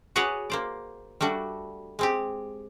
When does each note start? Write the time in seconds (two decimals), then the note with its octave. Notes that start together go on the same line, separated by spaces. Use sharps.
0.16 F#4 G#4 B4 C#5 D5 F#5
0.50 A#3 C5 D5
1.21 G3 A3 D4 F#4
1.99 G#3 C4 G4